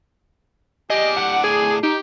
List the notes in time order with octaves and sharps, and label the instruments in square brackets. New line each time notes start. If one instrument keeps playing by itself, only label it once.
[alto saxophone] G4 [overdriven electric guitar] G#4 D5 [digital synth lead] D#5
[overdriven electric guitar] A2 D5 [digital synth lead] F#5
[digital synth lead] G#4 [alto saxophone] G#5
[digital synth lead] D#4 [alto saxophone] G4